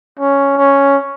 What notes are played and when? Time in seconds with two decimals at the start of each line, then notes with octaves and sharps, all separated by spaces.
0.19 C#4
0.57 C#4